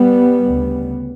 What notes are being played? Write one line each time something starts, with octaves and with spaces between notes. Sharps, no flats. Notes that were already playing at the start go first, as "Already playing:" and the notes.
Already playing: G3 B3
D2 C#3